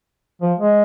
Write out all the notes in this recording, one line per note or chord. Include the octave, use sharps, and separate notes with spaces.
F3
G#3